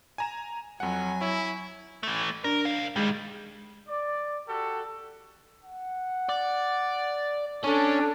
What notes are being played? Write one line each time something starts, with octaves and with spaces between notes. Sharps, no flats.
G#5 A#5 E7
F2 F#3 F#5 G#5
E4 C#5
E3 A3
D4 A#4
B1 F5
D#3 G3 G#3
D5
F#4 G4 A4
F#5
D5
C#4 D4 A4